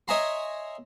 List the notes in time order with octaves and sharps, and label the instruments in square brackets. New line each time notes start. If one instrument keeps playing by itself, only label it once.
[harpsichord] C#5 D#5 E5 G#5 A#5 C6